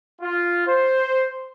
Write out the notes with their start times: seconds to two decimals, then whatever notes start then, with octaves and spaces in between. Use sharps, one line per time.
0.20 F4
0.67 C5